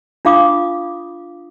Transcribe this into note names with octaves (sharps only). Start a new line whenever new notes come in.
D4 F4 F5 D6 D#6